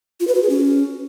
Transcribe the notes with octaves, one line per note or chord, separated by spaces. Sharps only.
F4
B4
F#4
G#4
C#4